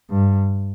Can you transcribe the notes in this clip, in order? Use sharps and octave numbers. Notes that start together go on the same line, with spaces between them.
G2